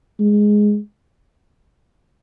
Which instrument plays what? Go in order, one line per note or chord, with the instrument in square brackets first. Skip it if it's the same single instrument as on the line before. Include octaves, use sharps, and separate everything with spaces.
[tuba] G#3